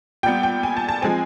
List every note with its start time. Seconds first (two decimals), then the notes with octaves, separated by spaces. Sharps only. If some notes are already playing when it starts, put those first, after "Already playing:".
0.23 A#2 G3 B3 G5
0.43 G5
0.63 G#5
0.77 A5
0.89 A5
1.02 F3 G#3 C4 G#5